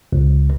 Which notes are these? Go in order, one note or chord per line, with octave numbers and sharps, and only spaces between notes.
C#2